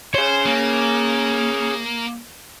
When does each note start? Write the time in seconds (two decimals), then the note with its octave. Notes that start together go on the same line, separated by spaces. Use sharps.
0.14 G#4 C5 C#5
0.45 A#3